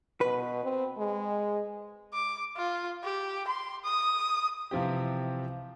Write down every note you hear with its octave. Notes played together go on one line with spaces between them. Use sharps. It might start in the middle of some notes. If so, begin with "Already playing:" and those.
B2 B4
C4
G#3
D6
F4
G4
C6
D#6
C3 E3 F3 C4 G4